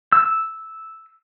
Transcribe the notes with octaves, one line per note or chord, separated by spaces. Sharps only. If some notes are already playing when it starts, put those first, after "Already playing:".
E6